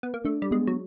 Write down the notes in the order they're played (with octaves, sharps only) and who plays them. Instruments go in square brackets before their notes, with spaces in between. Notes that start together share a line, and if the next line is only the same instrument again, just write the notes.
[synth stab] B3
A#3
[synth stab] A3 [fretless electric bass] D4
[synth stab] G3
[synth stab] G#3 [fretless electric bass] B3
[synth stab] F#3